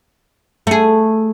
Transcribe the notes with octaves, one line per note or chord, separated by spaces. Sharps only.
A3 G#4